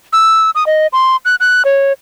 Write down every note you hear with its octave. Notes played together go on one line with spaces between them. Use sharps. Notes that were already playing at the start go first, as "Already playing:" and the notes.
E6
D#6
D#5
C6
F#6
F#6
C#5